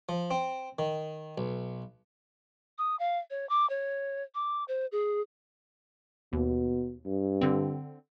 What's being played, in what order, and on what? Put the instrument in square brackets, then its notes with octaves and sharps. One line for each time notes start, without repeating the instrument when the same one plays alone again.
[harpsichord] F3
C4
D#3
B1
[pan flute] D#6
F5
C#5
D6
C#5
D6
C5
G#4
[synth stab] D#2 [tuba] B2
[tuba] G2
[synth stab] D3 C4